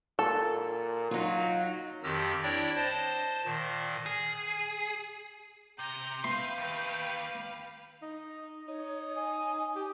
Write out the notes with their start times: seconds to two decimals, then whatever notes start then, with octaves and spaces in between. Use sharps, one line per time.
0.19 A#2 A4
1.11 F#3 D#4 F4
2.03 F2 D#3 G4 E6 F6 A#6
2.43 D4 E4 C#5 D5 G5
2.76 C5 D#5 A5
3.45 A#2 D#3
4.06 G#4
5.79 C3 G5 A#5 G6
6.24 B4 E5 F5 C6
6.58 D#2
8.02 D#4
8.68 D#4 C#5
9.16 D#5 G#5
9.75 G4